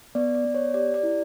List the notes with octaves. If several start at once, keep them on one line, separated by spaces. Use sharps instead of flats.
B3 D5
D5
B3
C#5
G4 D5
D5
E4